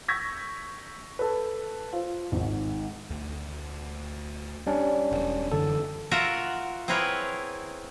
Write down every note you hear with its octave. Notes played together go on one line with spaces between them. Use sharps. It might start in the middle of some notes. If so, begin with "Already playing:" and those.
C#6 E6 G6 G#6 A#6 B6
A4 B4
F4 C5
G#1 G#2
D2
G3 C#4 D4
E1
F#2 D3 E3 A4
F4 F#4 A#4 E5 F#5
C4 E4 G#4 A#4 B4 C#5